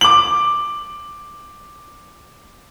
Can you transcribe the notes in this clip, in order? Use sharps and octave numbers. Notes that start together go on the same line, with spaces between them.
D6 F#7